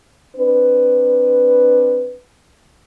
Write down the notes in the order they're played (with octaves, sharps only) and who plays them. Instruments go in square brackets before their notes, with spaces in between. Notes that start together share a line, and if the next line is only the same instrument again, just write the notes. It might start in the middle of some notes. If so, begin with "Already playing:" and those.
[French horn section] C4 D4 B4